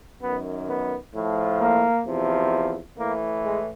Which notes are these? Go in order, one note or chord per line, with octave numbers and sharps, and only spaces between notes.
F#2 D#3 B3
B3
A2 F3
A#3
E2 C3 F3
A2 E3 A#3
G#3